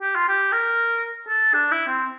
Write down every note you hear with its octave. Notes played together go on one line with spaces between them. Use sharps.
G4
F4
G4
A#4
A4
D4
E4
C4